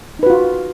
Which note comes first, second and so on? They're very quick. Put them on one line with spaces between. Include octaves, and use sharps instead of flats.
D#4 B4 F#4 F4